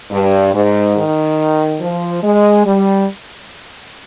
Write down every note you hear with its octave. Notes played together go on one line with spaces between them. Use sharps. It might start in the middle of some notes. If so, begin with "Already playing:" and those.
G2
G#2
D#3
F3
G#3
G3